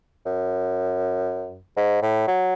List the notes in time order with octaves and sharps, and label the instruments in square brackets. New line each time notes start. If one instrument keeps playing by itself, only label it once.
[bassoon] F#2
G#2
A2
F#3